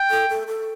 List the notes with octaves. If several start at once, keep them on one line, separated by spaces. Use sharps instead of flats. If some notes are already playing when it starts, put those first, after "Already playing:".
Already playing: G5
A4
A4
A4